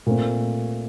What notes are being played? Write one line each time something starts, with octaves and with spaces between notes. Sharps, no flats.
A#2 A3 C4